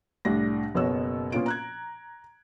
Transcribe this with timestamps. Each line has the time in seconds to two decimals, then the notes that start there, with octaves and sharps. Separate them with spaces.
0.25 C2 A2 D4 A#6
0.75 F#1 B2 B3 C#5 E6
1.32 A#2 B3 C#4 F4 D7
1.46 A#5 F#6 G#6